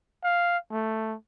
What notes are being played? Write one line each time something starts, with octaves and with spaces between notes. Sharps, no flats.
F5
A3